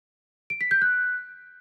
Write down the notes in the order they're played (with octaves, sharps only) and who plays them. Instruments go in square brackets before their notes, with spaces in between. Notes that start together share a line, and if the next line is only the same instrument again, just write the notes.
[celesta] D7
B6
G6
F#6